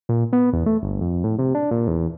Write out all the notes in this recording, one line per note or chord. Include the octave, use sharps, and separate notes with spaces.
A#2
B3
E2
A3
G1
F2
A2
C3
D4
A#2
E2